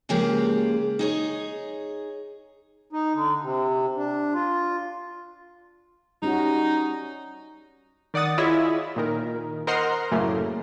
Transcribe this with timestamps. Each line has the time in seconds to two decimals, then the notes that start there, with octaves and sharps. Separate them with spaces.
0.09 C#3 F3 G#3 A#3 G4 B4
0.99 D#4 G#4 C#5
2.93 D#4
3.14 D3
3.43 C3
3.97 D4
4.34 F4
6.22 G3 C#4 D#4 F#4
8.14 D#3 D5 F#5 D#6 A6
8.38 E4 F4 G#4 C#5 D#5 E5
8.96 A#2 D#3 A#4
9.67 A#4 C5 D#5 F#5 A#5 C6
10.11 F#2 A2 C#3 A3 A#3